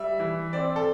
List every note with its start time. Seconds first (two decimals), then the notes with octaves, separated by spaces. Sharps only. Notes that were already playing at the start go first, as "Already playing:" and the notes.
Already playing: G3 E5
0.20 E3
0.53 C4 D5
0.76 A4